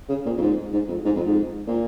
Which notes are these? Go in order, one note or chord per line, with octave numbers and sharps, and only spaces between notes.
C#3
A#2
F2
G#2
G#2
F2
G#2
F2
G#2
A#2